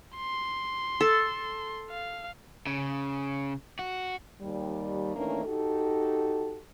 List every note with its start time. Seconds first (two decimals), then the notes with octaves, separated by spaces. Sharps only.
0.17 C6
1.01 A4
1.90 F5
2.67 C#3
3.79 F#4
4.41 D#2 G3
5.15 D#3 E3 A3 A#3 C#4 D4
5.46 D#4 F#4 G4 A4